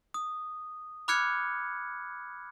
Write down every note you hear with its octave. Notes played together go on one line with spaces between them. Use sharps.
D#6
B5 D6 F6 F#6 G#6 C#7